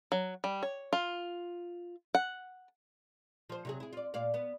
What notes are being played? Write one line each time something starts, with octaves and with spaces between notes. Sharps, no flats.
F#3
G3
C#5
F4
F#5
F3 C5
C3 F#3 G#4
E4 G#4
F4 D5
A#2 D5 F5
B3